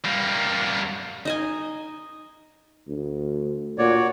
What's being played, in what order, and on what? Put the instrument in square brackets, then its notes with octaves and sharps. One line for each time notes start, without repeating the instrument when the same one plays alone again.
[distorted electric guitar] G3 A#3
[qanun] D#4 D#5 G#5
[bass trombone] D2
[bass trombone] A#2 [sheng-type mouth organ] F#4 C#5 D5